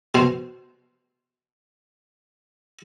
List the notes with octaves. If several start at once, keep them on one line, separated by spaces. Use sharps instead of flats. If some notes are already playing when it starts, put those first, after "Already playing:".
B2 C5